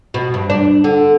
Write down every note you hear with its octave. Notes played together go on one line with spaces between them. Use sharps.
B2
G2
D4
D3